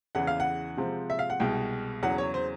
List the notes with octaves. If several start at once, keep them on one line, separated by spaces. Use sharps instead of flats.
E2 C#3 E3 F#5
F5
F#5
C3 F3 G#3 C4
E5
F5
F#5
C2 B2 G#3 G5
E2 C#3 F#3 F#5
C#5
C5